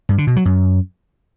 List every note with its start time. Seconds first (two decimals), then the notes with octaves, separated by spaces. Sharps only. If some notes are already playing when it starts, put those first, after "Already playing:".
0.09 G2
0.18 D3
0.27 B2
0.36 F#3
0.45 F#2